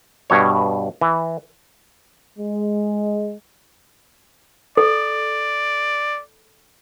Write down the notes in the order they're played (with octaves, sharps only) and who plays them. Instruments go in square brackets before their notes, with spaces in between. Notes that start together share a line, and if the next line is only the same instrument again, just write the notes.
[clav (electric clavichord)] G2 B2 C#5
E3
[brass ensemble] G#3
[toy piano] A4 [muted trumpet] D5